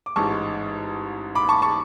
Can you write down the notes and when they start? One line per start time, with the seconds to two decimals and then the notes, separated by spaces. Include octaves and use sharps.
0.06 D6
0.16 A1 G#2 G#3 A5 C#6
1.35 B5 D6
1.49 A5 C#6
1.62 A5 C#6